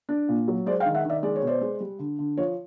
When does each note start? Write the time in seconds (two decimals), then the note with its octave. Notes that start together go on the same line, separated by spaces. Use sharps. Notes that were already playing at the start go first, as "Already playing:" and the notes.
0.09 D4
0.28 A#2
0.48 F#3
0.66 G#3 C5 D5
0.80 F5 G5
0.85 D#3
0.94 E5 F#5
1.05 D#3 D5 E5
1.23 G#3 D5
1.36 C#5
1.42 B2
1.47 C5 D5
1.61 G#3
1.80 G3
1.99 D3
2.19 D3
2.37 F3 C#5